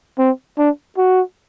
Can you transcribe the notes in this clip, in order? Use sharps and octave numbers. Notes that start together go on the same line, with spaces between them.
C4
D4
F#4